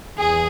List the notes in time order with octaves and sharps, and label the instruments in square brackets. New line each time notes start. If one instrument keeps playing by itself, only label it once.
[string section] E2 G#4